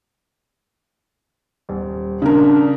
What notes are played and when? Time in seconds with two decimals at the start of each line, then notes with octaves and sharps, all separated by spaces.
1.69 D#1
2.22 C#3 D4 A#4